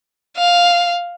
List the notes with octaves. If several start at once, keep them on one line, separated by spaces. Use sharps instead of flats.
F5